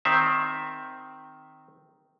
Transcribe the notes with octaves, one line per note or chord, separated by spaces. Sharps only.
D#3 C4 E5